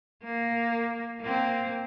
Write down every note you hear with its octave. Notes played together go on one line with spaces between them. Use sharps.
A#3
A#3 C4